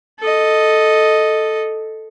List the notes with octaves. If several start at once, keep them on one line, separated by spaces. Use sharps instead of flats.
A4 D#5